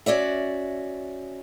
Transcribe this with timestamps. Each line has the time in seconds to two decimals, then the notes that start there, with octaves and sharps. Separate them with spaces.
0.06 C#4 F#4 D5 E5